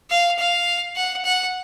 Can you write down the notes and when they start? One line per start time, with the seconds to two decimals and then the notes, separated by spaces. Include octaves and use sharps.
0.10 F5
0.38 F5
0.96 F#5
1.24 F#5